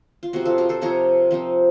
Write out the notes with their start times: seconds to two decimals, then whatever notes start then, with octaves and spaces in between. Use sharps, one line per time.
0.23 F4
0.33 C3 F3 C4 D#4 F#4
0.45 F4 A4
0.58 F#4 A#4
0.69 A4 C5
0.81 C3 F3 C4 D#4 A#4 C#5
1.31 F3 C4 D#4